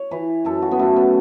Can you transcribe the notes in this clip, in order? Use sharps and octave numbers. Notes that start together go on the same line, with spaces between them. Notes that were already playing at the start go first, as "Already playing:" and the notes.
Already playing: C#5
E3 B4
F#2 A4
F#4
B3
F#2 A3
B3